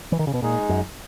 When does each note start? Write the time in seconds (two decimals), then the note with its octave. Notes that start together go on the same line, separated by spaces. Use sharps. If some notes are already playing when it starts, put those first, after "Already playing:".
0.12 E3
0.19 D#3
0.27 C#3
0.34 B2
0.42 A#2 G#3 D#4 G#4
0.69 F#2